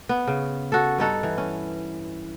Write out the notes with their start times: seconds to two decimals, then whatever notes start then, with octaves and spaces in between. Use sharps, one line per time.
0.09 B3
0.28 C#3
0.72 F#4 A4
0.98 G2 D#4 A4 F#5
1.23 E3
1.38 C#4